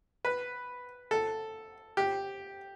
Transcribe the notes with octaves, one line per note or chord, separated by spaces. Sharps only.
B4
A4
G4